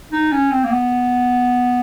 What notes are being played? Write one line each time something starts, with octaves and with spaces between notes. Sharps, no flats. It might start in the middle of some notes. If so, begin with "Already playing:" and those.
D#4
C#4
C4
A#3
B3